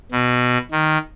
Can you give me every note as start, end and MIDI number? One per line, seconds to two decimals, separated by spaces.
0.11 0.57 47
0.71 0.98 51